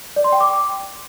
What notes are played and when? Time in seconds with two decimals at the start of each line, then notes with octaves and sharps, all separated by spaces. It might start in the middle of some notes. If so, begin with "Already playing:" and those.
0.16 D5
0.24 C6
0.32 G5
0.40 D6